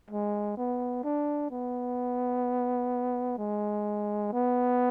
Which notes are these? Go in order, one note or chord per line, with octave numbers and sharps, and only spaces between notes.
G#3
B3
D4
B3
G#3
B3